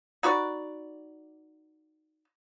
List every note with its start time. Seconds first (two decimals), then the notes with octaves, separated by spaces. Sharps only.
0.23 D#4 F#4 B4 D5